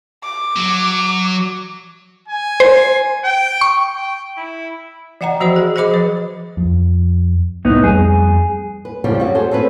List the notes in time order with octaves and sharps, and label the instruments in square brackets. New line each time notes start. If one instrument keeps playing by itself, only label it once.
[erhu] D6
[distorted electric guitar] F#3
[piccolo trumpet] G#5
[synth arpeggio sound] C5
[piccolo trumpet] G5
[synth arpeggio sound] C#6
[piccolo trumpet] G5
E4
[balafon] E3 D#5 F#5 G5 A#5
F3 F#4 C5 E5 B5
G#4
G#4 C5 D#5 B5 D6
F3 B4
[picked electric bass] F2
[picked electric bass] C2 [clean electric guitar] A2 B3 D#4
[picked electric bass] F2 G3 [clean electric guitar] G#4
[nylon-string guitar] B4
D#2 A2 C#3 F3 G3 C4
F#2 F#3 F#4
G#4 A4 C5
C4 C#4 A4 B4